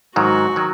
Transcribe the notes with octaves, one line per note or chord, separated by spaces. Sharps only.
G#2 D#3 F#3 F#4
D#3 F#3